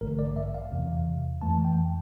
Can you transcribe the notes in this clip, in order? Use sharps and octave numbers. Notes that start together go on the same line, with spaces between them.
A1 G2 D3 A3 A#4
D5
E5
F5
E2 C3 E3
F2 E3 A3 A5
G5